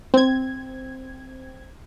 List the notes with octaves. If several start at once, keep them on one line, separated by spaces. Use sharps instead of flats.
C4 G#6